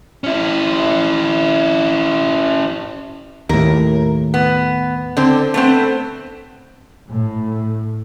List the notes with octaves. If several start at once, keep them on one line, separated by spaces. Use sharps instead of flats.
C#4 E4
D#2 A2 A#4
B3
D3 C4
A3 B3 C4
A2